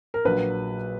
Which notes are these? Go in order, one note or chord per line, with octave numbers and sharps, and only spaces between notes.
A#4
A#1 A#2 F#3 B4